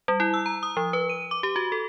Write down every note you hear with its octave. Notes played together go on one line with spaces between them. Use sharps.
G3
E4
E6
A#5
D#6
F3
B4
D#7
D6
G4
F#4
A4